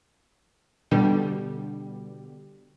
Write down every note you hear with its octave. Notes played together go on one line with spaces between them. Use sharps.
B2 D3 G3